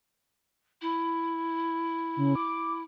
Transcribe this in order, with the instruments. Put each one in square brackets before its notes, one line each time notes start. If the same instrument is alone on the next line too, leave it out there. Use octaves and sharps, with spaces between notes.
[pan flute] E4
[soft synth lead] C#3
D6